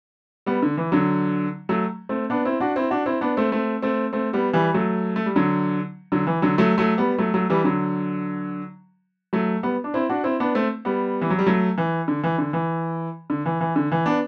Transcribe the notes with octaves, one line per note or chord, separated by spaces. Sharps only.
G3 B3
D3
E3
D3 F#3
F#3 A3
A3 C4
B3 D4
C4 E4
D4 F#4
C4 E4
D4 F#4
C4 E4
B3 D4
A3 C4
A3 C4
A3 C4
A3 C4
G3 B3
E3 G3
F#3 A3
A3
G3
D3 F#3
D3 F#3
E3
D3 F#3
F#3 A3
F#3 A3
G3 B3
F#3 A3
F#3 A3
E3 G3
D3 F#3
F#3 A3
G3 B3
D4
C4 E4
D4 F#4
C4 E4
B3 D4
A3 C4
G3 B3
E3
F#3
G3
F#3 A3
E3
D3
E3
D3
E3
D3
E3
E3
D3
E3
B3 D4